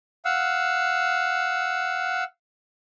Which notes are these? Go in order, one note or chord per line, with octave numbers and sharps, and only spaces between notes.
F5 F#5 E6